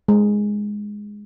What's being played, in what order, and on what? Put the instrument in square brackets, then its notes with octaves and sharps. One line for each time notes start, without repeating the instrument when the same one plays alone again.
[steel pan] G#3